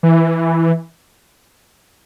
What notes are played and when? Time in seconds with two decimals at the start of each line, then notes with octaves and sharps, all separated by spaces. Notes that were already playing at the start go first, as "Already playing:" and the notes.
0.03 E3